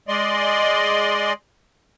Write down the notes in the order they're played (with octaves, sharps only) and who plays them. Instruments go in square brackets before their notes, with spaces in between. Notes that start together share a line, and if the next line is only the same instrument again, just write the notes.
[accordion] G#3 D5 D#5 C6